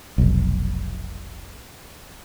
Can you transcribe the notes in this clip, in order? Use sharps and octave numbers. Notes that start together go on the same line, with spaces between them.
F1 B1